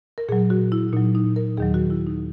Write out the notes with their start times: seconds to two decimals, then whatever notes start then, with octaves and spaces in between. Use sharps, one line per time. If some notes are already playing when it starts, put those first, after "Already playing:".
0.18 A#4
0.28 A#2 G#4
0.32 F#3
0.50 F#4
0.72 E4
0.93 A#2 F#3 D#4
1.15 D#4
1.36 A#4
1.57 D#2 D#3 F#3 G#4
1.74 F#4
1.90 E4
2.07 D#4